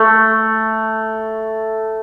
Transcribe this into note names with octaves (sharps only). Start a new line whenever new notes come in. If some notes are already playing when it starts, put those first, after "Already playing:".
Already playing: A3